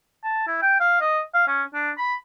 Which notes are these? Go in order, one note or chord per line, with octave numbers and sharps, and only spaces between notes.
A5
E4
G5
F5
D#5
F5
C#4
D4
B5